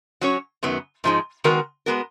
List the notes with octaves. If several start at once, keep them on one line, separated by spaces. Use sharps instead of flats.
F#3 C#4 F#4 C#5
F#2 D#3 F#3 B3
G#2 F3 G#3 D#4
D#3 G#3 B3 F#4 A#4
G#3 B3 F#4 A#4